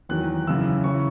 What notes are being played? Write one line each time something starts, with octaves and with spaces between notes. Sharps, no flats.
E2 D#3 F#3 F#6
F#2 C#3 E3 E6
C#3 E3 C#6